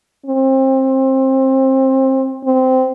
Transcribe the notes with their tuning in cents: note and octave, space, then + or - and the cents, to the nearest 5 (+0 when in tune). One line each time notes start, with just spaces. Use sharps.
C4 +25
C4 -15